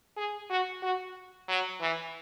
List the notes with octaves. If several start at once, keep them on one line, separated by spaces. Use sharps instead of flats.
G#4
F#4
F#4
F#3
E3